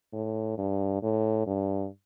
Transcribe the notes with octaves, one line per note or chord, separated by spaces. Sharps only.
A2
G2
A2
G2